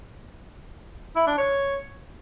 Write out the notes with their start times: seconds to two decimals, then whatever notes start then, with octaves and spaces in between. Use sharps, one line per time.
1.16 E4
1.27 D4
1.38 C#5